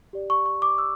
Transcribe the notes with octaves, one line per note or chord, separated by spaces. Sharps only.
G4 D5
C#6
C#6
D6
E6